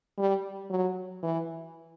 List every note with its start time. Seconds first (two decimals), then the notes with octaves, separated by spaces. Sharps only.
0.18 G3
0.70 F#3
1.23 E3